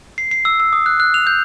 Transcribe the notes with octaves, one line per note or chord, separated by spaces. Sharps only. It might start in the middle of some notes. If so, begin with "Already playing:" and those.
C7
C7
E6
E6
D#6
F#6
F#6
F7
G6